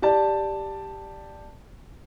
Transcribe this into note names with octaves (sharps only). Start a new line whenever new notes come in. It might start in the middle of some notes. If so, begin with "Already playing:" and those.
G4 D5 A5